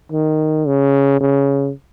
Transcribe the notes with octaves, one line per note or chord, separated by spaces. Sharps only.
D#3
C#3
C#3